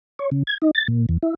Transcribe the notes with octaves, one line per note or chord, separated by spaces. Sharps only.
C#5
C#3
G#6
D#4
A6
A#2
E2
E4